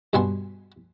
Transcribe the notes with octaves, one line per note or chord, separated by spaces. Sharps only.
G2 B2 B3 D4 G#5 C6